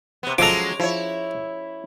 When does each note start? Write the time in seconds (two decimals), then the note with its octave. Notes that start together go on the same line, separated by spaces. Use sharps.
0.23 C3 B3
0.38 F3 F#3 G#3 C#4 A4 A#5 D6
0.80 F3 E4 C#5